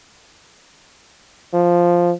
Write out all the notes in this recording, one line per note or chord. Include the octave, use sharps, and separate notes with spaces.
F3